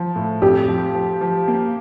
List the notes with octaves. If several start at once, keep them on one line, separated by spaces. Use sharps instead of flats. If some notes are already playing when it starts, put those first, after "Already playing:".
Already playing: F3
A2
F2 G4
F3
F3
F3
A#3